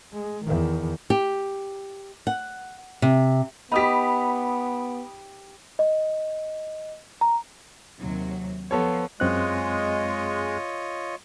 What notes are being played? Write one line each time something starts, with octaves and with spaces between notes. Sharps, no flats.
G#3
E2 D#3
G4
F#5
C3
B3 D#4 G4 B5 D#6 B6
D#5
A#5
D#2 C3 F#3
F3 B3 A4 C#5
F#2 G#3 C4 F4 C#5 D#5 F#6